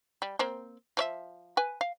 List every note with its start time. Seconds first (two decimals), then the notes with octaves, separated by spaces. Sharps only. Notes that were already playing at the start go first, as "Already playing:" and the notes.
0.22 G3
0.39 A#3 C4 C5
0.97 F3 C#5 E5
1.57 B4 G#5
1.81 F5